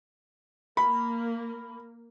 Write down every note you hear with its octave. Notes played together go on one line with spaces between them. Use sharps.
A#3 B5